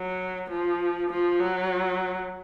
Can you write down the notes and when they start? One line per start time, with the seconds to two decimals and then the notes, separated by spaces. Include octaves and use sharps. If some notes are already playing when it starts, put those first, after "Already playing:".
Already playing: F#3
0.51 F3
1.10 F3
1.40 F#3